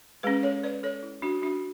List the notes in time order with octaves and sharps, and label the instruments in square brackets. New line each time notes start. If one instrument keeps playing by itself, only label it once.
[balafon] G#3 G#4 B4
C#4
A4 C#5
B4 D5
A4 C#5
E4
D4 F#4
D4 F#4